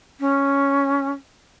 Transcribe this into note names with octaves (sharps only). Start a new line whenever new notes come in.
C#4